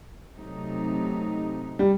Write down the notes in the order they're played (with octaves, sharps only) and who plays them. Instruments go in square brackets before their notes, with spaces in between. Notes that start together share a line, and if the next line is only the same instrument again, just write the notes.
[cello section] C3 F#3 A3 D#4
[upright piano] G3